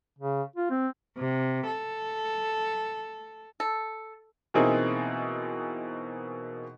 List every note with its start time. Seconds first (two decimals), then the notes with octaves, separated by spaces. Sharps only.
0.19 C#3
0.56 F4
0.70 C4
1.17 C3
1.67 A4
3.60 A4
4.54 B2 E3 A#3 C4 D#4 G#4